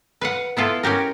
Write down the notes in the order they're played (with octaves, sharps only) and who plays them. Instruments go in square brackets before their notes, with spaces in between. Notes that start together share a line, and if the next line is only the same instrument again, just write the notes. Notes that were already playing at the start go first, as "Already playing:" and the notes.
[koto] B4 F5 F#5
B3 E4 F4 A4
C#4 F#4 G4 A#4